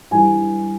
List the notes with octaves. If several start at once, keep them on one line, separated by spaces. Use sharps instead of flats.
G2 E3 G#5